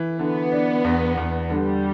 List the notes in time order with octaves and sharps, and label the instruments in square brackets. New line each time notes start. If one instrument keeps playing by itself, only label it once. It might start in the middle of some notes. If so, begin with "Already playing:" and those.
Already playing: [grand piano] E3
[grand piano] D3 [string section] B3
[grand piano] D4
E2
E2
[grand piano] D3 [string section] G3